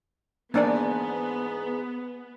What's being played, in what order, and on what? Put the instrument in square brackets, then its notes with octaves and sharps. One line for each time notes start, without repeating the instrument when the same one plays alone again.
[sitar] E2 G#2 [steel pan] A#3 D4 D5 [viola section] B3